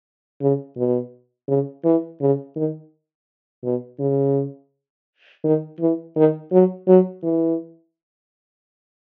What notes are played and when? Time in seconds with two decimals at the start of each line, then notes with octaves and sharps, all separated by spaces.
0.42 C#3
0.77 B2
1.48 C#3
1.84 E3
2.21 C#3
2.56 D#3
3.64 B2
4.00 C#3
5.44 D#3
5.80 E3
6.16 D#3
6.52 F#3
6.88 F#3
7.23 E3